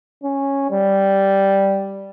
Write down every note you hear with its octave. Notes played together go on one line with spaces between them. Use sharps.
C#4
G3